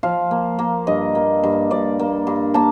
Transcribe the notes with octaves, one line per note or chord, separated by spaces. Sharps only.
F3 F5
A#3
A#3
G2 D#5
A#3
G2
G2 D5
A#3
G2
A#3 A5